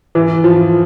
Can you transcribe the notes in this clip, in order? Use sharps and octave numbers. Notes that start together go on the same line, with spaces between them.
E3
F3